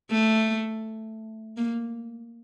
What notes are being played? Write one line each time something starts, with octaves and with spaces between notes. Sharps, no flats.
A3
A#3